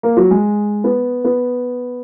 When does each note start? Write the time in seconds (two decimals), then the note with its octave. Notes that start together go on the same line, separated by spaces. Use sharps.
0.03 A#3
0.17 F#3
0.31 G#3
0.84 B3
1.25 B3